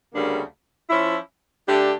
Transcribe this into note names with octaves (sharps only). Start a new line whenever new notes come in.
D2 C#3 G3 A#3 D4
F3 C#4 E4
D3 A3 D4 G4